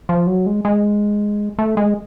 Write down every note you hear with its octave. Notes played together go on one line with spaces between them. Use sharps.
F3
F#3
G#3
G#3
A3
G#3